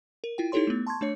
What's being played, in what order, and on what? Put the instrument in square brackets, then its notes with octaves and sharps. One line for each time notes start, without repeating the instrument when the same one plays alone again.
[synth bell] A#4
E4 F4 G5
D#4 E4 G4 A4 C#5 C6
A3 B3
A5 C6 C#6 G#6
A3 D4 C#5 C#7